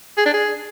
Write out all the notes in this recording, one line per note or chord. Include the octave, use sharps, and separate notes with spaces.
G#4
D4
G#4